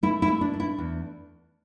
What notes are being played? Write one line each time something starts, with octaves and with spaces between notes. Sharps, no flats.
A3 E4
E4
A3
D4
D4
E4
E2